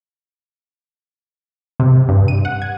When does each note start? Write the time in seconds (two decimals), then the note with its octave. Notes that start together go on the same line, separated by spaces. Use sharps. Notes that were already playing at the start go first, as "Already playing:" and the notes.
1.80 C3
2.09 G2
2.28 D#7
2.45 F#5
2.62 G#6